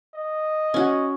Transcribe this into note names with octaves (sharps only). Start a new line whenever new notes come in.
D#5
C#4 F#4